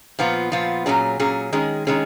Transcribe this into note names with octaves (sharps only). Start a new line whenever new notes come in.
A#2 F3 B3 F4
A#2 F3 B3 F4
A#2 F#3 C#4 G#4
A#2 F#3 C#4 G#4
D#3 G#3 C#4 G#4
D#3 G#3 C#4 G#4